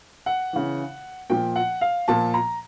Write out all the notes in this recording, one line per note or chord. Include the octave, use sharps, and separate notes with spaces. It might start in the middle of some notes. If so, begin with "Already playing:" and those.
F#5
C#3 E3
A#2 F3 G5
F#5
F5
A#2 F3 A5
A#5